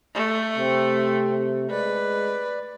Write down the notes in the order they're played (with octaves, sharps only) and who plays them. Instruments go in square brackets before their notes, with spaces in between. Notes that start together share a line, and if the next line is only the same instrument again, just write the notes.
[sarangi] A3
[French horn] C3 [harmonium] C4
[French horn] G#3 [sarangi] B4 [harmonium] D5